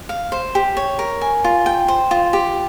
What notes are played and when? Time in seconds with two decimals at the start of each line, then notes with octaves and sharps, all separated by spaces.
0.09 F5
0.32 C5
0.55 G4
0.77 C#5
0.99 A#4
1.21 G#5
1.44 F4
1.66 G5
1.88 C5
2.11 F4
2.33 G4